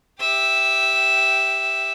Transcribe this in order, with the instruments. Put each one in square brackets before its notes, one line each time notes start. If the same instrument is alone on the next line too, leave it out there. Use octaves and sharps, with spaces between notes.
[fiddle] G4 E5